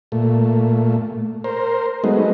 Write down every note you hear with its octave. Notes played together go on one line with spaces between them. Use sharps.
A#2 A3
A#4 C5
F#3 G#3 A3 B3 D#4